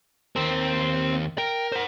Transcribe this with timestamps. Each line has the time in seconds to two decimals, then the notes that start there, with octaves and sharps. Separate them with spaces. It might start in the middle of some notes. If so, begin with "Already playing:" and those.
0.36 D#2 C4 A#4
1.38 A#4 G5
1.72 C5 F#5